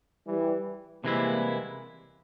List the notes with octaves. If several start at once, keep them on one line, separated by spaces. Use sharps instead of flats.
E3 G3
C3 E3 G3 G#3 A#3 E4